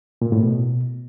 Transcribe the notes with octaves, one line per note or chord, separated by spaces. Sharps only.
A#2
A2
B2